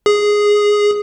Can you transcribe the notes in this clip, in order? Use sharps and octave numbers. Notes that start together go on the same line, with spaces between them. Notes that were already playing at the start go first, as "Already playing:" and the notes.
G#4